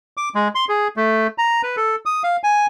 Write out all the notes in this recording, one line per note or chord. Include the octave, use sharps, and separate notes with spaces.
D6
G#3
C6
G#4
A3
A#5
B4
A4
D#6
F5
G#5